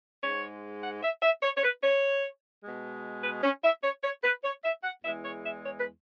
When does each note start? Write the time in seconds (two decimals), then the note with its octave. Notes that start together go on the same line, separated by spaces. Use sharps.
0.22 G#2 G#3 C#5
0.82 F#5
1.03 E5
1.22 E5
1.43 C#5
1.57 C#5
1.63 B4
1.83 C#5
2.63 B2 G#3
3.23 B4
3.43 C#4
3.64 E5
3.83 C#5
4.03 C#5
4.24 B4
4.44 C#5
4.64 E5
4.83 F#5
5.03 E2 E3 G#3 E5
5.24 C#5
5.44 E5
5.64 C#5
5.79 B4